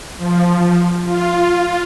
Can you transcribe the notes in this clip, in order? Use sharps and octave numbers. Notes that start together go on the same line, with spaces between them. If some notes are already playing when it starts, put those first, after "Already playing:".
F3
F4